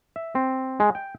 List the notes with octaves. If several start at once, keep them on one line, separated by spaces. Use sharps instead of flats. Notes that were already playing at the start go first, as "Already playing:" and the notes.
E5
C4
G#3
G5